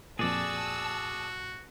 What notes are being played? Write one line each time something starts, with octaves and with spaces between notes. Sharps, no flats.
F2 A#2 F#4 G#4 D5 A5 E6